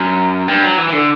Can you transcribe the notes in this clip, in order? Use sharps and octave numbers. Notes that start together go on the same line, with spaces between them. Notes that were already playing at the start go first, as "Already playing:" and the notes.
Already playing: F#2
G2
F#3
E3
E3
D3